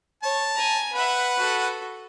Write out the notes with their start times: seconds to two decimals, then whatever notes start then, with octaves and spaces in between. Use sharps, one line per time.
0.23 C#5 A5
0.55 G#5 A#5
0.94 B4 E5 F#5 B5
1.37 F#4 A4